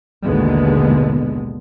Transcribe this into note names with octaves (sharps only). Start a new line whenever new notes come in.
A1 D#2 B2 D3 G#3 B3